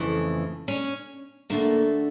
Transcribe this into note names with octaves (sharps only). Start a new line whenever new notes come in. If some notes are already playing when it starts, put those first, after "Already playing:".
Already playing: F2 C#3 E3 A3
C#4
D2 D3 A3 A#3